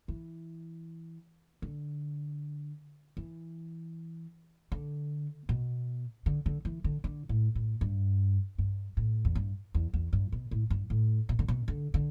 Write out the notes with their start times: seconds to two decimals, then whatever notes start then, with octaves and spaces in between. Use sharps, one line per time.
0.08 E3
1.62 D3
3.17 E3
4.72 D3
5.49 B2
6.26 D3
6.46 D3
6.65 E3
6.84 D3
7.04 D3
7.29 A2
7.55 A2
7.81 G2
8.58 G2
8.97 A2
9.25 E2
9.35 G2
9.74 E2
9.93 E2
10.13 G2
10.32 B2
10.51 A2
10.70 G2
10.90 A2
11.29 B2
11.39 D3
11.48 B2
11.68 D3
11.94 D3